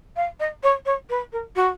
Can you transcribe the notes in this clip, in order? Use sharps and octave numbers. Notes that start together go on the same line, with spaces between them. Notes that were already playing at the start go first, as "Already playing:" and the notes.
F5
D#5
C#5
C#5
B4
A#4
F#4